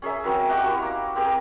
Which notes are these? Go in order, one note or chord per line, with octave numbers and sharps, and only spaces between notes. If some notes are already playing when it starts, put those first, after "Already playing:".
C#4 G#4 A#4 E5
C4 C#4 F#4 A#4
F#4 G4 D#5 F#5
E4 A#4 C#6
A#3
C4 G4 G#4 A#4